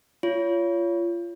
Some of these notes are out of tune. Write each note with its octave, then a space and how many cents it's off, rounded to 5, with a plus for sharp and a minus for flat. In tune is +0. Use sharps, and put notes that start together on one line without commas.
F4 -25 C#5 +25